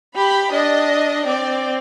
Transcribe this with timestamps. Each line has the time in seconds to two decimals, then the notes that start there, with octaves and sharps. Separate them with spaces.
0.16 G4 B5
0.53 D4 D#5
1.27 C4 D5